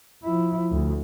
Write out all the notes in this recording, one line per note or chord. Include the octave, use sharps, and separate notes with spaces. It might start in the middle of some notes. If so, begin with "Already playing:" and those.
F3 E4
D2